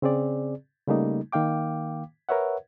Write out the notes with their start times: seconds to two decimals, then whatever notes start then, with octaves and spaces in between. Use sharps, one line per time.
0.02 C#3 C4 G#4 D5
0.88 C#3 G3 A3 A#3 D#4
1.32 D#3 A#3 F5 G5 D6
2.29 A#4 B4 C#5 E5 F#5